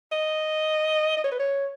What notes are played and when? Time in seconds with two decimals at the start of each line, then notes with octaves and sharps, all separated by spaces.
0.12 D#5
1.17 D#5
1.24 C#5
1.32 B4
1.40 C#5